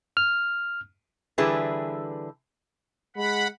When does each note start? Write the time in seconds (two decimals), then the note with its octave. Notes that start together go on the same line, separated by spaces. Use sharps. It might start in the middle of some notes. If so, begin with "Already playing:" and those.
0.17 F6
1.38 D3 E3 G3 E4 G#4 B4
3.16 G#3 F#5 B5